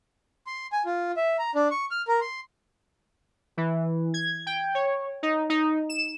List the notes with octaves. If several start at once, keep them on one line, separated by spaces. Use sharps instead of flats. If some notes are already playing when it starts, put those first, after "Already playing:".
C6
G#5
F4
E5
A#5
D4
C#6
F6
A#4
C6
E3
G#6
G5
C#5
D#4
D#4
E7